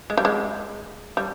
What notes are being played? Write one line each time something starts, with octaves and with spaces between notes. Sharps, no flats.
G#3
G3
G#3
G3